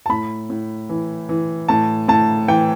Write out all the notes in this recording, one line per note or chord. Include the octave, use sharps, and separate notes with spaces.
A5
A2 B5
A2
E3
E3
A2 A5
A2 A5
E3 G5